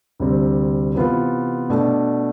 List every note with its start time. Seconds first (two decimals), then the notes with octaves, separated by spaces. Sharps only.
0.20 D2 C3 G3 C4
0.95 C3 E3 B3 F4
1.70 B2 A3 D4